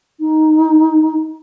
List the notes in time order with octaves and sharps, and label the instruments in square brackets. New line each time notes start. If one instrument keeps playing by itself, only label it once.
[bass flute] D#4